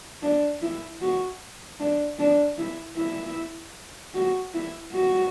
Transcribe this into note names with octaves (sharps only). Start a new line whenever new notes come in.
D4
E4
F#4
D4
D4
E4
E4
F#4
E4
F#4